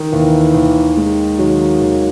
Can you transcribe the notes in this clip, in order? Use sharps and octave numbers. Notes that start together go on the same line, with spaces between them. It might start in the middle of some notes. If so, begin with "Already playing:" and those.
Already playing: D#3
D#2 E3
D#2
G#3
D#3 F#3
D#2